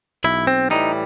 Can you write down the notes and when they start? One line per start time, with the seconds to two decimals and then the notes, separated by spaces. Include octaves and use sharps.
0.24 B1 E4
0.47 C4
0.70 A2 E3 G3 D#4